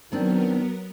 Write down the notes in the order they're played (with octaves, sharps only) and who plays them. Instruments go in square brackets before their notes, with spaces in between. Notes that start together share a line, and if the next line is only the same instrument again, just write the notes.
[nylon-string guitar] D#3 C4 D4 [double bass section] F#3 [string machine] B3 A#4